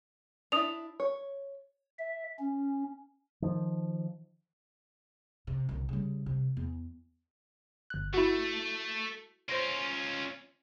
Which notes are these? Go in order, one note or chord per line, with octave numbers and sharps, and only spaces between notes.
D4 E4 D#6 F7
C#5
E5
C#4
D#3 F3
C3
C2 D3
C#3 G3
C3
E2
G1 F#6
A3 E4 F#4
C#4 F4 C5 A#6 D7